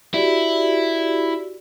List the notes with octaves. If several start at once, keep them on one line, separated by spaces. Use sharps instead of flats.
E4 F#4 G4 D5